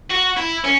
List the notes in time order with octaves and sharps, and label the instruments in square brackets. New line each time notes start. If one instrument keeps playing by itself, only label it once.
[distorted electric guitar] F#4
E4
C#4